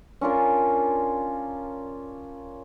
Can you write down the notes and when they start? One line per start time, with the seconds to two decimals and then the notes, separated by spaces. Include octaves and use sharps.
0.21 C#4 D4 F4 A#4